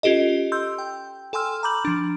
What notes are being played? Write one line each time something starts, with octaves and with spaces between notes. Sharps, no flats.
C#4 F4 G4 A4 D#5
C6 E6 G6
G5
A4 G5 G#5 C6 E6 F6
A#5 B5 D6 G6 F#7
F3 D4